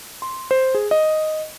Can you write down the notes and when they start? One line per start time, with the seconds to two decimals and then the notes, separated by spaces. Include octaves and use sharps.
0.22 C6
0.51 C5
0.75 G#4
0.91 D#5